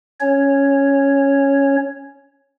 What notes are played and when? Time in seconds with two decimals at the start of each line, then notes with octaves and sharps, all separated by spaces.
0.20 C#4 C#5